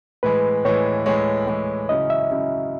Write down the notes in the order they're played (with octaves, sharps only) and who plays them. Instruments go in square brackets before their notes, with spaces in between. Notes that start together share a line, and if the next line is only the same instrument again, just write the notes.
[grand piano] A2 E3 G#3 [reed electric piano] B4
[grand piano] A2 E3 G#3 [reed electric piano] C#5
[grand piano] A2 E3 G#3 [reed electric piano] C#5
[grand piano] A2 E3 G#3
[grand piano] C#3 F#3 C#4 E4 [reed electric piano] D#5
[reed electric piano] E5
[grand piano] C#3 F#3 C#4 E4